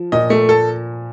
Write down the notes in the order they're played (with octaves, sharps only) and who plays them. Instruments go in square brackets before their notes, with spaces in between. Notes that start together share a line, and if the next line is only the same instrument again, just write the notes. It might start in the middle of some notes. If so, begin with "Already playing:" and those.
Already playing: [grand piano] F3
[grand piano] A#2 [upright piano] D#5
[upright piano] A3
A4